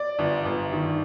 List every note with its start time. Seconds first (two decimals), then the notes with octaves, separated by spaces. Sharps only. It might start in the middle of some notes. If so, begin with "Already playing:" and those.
Already playing: D5
0.19 G1
0.46 G1
0.72 D#3